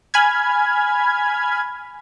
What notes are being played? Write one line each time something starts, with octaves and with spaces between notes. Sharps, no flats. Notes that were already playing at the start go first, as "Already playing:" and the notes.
G#5 B5 F6 G#6